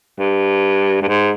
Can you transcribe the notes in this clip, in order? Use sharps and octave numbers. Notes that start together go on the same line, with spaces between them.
G2
G2
G#2